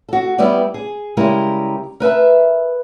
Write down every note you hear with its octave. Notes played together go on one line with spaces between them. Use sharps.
F#4 A4
G3 B3 E4 G4 D5
G#4
C#3 G3 G#3 E4 G4 A#4
A#4 B4 E5 A5